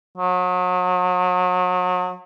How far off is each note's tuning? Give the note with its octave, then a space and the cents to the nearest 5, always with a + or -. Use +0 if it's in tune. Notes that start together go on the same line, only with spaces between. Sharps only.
F#3 -35